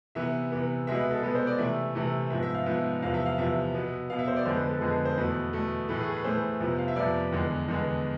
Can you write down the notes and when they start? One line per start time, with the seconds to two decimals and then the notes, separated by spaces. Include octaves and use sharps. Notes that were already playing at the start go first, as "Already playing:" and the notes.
0.15 C3 E3 B3 E5
0.52 C3 E3 B3
0.87 B2 G#3 B3 E5
0.99 B4
1.11 A4
1.22 B2 G#3 B3 B4
1.35 C5
1.47 D5
1.58 C3 E3 A3 E5
1.95 C3 E3 A3
2.30 G#2 F3 B3 E5
2.43 E5
2.54 F5
2.66 G#2 F3 B3 E5
3.02 E2 C3 F3 B3 F5
3.14 E5
3.26 F5
3.38 E2 C3 F3 B3 E5
3.74 B2 B3
4.10 B2 B3 F5
4.19 E5
4.28 C5
4.36 D5
4.45 F2 D3 G#3 B3 C5
4.58 B4
4.69 A4
4.81 F2 D3 G#3 B3 G#4
5.05 C5
5.17 E2 B2 A3 B4
5.53 E2 B2 A3
5.89 A2 E3 A3 B4
6.01 G#4
6.13 B4
6.25 A2 E3 A3 C5
6.60 F2 C3 F3 B3
6.79 F5
6.88 E5
6.96 F2 C3 F3 B3 D5
7.32 E2 D3 G#3 B3
7.68 E2 D3 G#3 B3